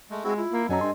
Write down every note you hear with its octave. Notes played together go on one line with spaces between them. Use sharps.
G#3 A3
G#3 C4 E4 F#4 G#4
E4 F4
A#3
F#2 F#3 C#4 A4 D#5 G#5 A#5
G2 C6